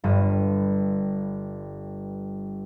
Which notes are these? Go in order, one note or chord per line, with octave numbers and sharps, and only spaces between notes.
G1 G2